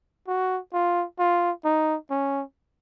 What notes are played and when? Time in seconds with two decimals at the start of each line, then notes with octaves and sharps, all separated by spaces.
0.28 F#4
0.73 F4
1.19 F4
1.65 D#4
2.11 C#4